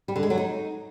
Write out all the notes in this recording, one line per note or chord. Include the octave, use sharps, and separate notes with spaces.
G3
D3
G#3
F#3
D#4